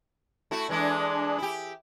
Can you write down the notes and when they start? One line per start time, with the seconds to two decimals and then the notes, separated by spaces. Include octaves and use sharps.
0.51 A3 E4 F#4
0.69 E3 G#3 D4 E4
1.38 E4 G4